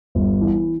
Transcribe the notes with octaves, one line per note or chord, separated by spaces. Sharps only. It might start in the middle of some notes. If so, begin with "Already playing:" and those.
G1
E3